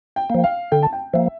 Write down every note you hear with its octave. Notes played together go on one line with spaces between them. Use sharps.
G5
F3 A#3
F5
D3 G5
A5
G5
F3 A#3 E5